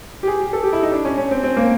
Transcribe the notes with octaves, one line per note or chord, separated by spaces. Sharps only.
G4
G#4
G4
A4
G4
E4
D#4
D4
C#4
C#4
C4
C4
A#3